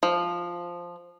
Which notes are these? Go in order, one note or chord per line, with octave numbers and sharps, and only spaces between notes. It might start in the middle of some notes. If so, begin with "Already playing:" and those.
F3